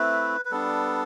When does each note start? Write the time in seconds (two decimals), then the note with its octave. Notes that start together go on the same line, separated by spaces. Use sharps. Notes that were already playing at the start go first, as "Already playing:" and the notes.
Already playing: A3 C4 E4 B4
0.45 B4
0.51 G3 B3 D4 A4